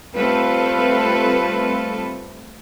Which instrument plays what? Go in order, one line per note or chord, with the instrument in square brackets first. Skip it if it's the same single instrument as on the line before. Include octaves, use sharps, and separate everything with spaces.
[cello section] G3 A3 C4 F4 A4 B4